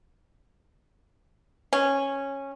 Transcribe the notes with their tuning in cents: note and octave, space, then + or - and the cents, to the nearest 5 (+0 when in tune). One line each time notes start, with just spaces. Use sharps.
C#4 -10